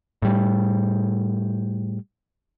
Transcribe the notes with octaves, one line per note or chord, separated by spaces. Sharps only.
A2 G3